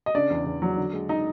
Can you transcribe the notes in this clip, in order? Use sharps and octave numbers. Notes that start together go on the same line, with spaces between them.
D#5
C#3 D4 D5
E2
E2
F#3
D3
G#3
D#4 D#5